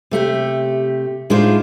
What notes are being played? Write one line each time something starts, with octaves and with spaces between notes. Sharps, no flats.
C3 A3 G4
A2 G#3 D4 D#4 F4 C5